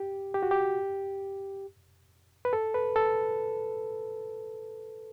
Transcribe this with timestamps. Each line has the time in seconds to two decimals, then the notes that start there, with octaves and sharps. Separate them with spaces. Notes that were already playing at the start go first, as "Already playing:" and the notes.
Already playing: G4
0.34 G4
0.43 F#4
0.51 G4
2.45 B4
2.53 A4
2.74 B4
2.96 A4